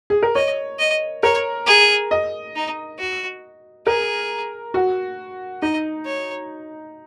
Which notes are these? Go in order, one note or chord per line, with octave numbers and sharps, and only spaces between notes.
G#4
A#4
C#5 D#5
D#5
A#4 C#5
G#4
D#5
D#4
F#4
G#4 A#4
F#4
D#4 D#5
C#5